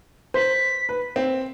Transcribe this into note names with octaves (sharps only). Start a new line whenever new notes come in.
C5 B6
B4
C4